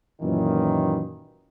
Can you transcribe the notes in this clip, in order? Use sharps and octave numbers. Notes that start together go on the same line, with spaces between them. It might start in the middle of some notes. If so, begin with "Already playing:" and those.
F#2 A#2 D#3 E3